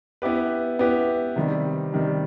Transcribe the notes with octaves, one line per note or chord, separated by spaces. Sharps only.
B3 E4 G4 B4
B3 E4 G4 B4
C3 D#3 G3
C3 D#3 G3